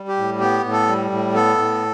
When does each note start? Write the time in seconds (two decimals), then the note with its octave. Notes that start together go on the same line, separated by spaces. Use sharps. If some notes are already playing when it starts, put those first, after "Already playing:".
Already playing: G3
0.08 G4
0.16 A2
0.40 B3 G4
0.64 A2
0.72 A4
0.87 G3
1.11 A2
1.34 B3 A4
1.58 A2